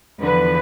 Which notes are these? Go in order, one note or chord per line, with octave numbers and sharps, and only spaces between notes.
E2 D3 F3 B4